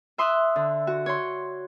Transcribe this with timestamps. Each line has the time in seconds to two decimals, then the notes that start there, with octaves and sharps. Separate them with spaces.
0.18 E5 C6 D#6 E6 F#6
0.56 D3
0.87 F#4
1.06 C#5 C6